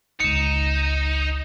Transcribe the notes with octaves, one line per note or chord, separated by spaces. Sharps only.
G1 C#2 D#4 C#7 E7